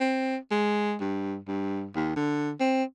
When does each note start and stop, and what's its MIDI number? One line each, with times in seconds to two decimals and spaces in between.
0.01 0.36 60
0.51 0.96 56
1.01 1.37 43
1.48 1.88 43
1.95 2.15 39
2.16 2.52 50
2.60 2.84 60